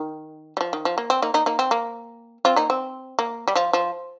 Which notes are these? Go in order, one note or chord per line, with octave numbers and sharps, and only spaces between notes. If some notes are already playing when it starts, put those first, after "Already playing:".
Already playing: D#3
G3
F3
D#3
F3
A#3
C4
A#3 D#4
A#3 D#4
A#3 D#4
C4
A#3
C4 F4
A#3 D#4
C4
A#3
G3
F3
F3